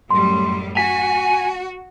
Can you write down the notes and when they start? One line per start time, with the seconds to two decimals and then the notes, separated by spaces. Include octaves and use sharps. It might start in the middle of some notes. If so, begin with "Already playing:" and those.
0.11 F#2 A2 G3 C6
0.77 F#4 G#5 B6